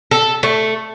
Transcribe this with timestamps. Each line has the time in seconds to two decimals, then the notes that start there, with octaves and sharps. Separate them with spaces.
0.11 A4
0.43 A3